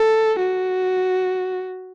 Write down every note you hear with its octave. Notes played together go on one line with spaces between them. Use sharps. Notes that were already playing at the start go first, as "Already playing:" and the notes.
Already playing: A4
F#4